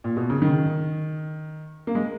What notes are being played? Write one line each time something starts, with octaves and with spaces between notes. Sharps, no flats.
A#2
B2
C#3
D#3
A#3
G#3